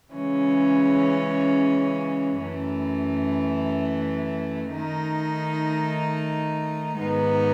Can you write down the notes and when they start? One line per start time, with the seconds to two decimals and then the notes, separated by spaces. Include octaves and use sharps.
0.11 C#3 E3 G#3 C#4
2.41 F#2 E3 A3
4.71 D#3 A3 D#4
6.99 G#2 D#3 G#3 B3 D#4